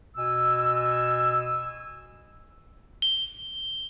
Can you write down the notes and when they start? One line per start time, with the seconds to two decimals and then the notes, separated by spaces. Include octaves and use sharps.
0.16 B2 G#5 E6
3.02 G7